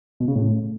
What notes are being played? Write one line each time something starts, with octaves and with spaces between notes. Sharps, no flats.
B2
C#3
A2